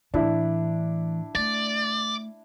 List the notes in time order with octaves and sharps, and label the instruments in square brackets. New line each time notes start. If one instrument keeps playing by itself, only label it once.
[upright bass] A2 E3 [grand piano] D4 E4
[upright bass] A3 [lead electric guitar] D5